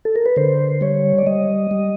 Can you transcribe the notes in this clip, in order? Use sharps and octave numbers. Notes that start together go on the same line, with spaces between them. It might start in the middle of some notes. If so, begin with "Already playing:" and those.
A4
A#4
B4
D3 C5
G3 C#5
D5
G3 D#5
G3